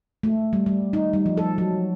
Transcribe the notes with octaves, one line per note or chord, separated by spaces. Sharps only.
A3
G3
G3
D#4
G3
F3
A4
F#3